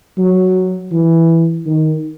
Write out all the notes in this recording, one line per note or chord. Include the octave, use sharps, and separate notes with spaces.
F#3
E3
D#3